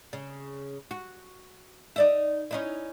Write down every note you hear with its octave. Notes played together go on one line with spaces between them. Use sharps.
C#3
F#4
D#4 D5 E5
C#4 D#4 E4